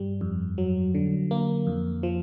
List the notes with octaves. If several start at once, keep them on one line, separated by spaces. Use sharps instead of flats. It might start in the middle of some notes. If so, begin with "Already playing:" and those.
Already playing: G2 G3
F2
F#3
D3
A#3
F2
F3